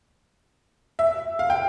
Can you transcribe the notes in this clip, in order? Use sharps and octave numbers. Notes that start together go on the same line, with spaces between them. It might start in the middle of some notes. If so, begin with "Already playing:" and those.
E5
F5
G5